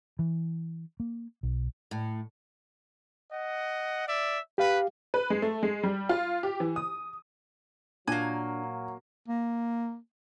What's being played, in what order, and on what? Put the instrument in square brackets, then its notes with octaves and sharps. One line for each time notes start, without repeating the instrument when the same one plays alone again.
[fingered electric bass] E3
A#3
B1
[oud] A2
[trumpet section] D#5 F#5
D5 E5
[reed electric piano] G4 F5 [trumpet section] B4
[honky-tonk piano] B4
G#3
A3
G#3
G3
F4
G4
E3
D#6
[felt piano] A#2 [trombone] F#3 [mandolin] A#3 G#5 [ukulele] D4
[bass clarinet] A#3